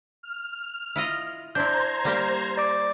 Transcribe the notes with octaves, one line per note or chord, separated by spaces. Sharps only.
F6
E4 F4 D#5
D4 E4 C5 A#5 G6 G#6
G3 A#3 G4
D5 D6